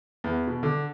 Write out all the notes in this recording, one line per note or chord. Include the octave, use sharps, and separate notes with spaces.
E2
B2
D3